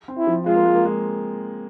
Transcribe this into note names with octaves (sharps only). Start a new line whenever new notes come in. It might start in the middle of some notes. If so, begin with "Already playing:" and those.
C4
E4
F3
G#3 F4
A#3
G#3
A#3
G#3